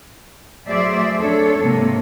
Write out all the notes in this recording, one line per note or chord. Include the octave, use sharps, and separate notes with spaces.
F#3 A3 G#4 C5 D5 E5
D4 A4 C#5
G#2 C3 A#3